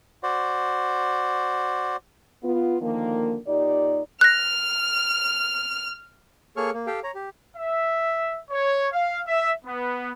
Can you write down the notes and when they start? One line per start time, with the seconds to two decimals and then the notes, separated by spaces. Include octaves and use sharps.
0.23 F#4 C5 D5
2.43 B3 F4
2.81 D3 D#3 F3 A#3
3.47 A#2 D#4 G4 D5
4.21 F6 F#6 A#6
6.57 A#3 G#4 A4 C#5 C#6 F6
6.74 A#3
6.87 G4 A4 F5 G5
7.04 C#5 A#5
7.15 G4
7.55 E5
8.50 C#5
8.92 F5
9.26 E5
9.65 B3